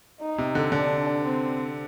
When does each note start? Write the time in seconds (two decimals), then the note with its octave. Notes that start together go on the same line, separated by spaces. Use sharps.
0.21 D#4
0.38 C3
0.55 D3
0.72 D3 D4
1.24 C4